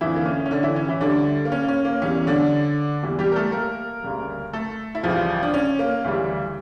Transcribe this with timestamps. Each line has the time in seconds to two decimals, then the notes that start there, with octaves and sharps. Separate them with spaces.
0.01 F2 D3 E3 F3 E4
0.16 A#3
0.26 C#4
0.46 C#4
0.51 D3 D4
0.63 E3 E4
0.76 C#4
0.88 E3 E4
1.01 D2 D3 G3 D4
1.45 A#3
1.52 C#4
1.63 A#3
1.68 C#4
1.85 A#3
2.02 E2 E3 G3 C#4
2.27 D3 D4
3.02 E2 E3 G3
3.19 G3 G4
3.32 A#4
3.36 A3 A4
3.52 A#3 A#4
4.03 D2 C#3 G3
4.53 A3 A4
4.95 E4
5.03 C#2 C#3 E3 F3 G3 F4
5.43 D4
5.54 C#4
5.79 A#3
6.04 D2 C#3 E3 G3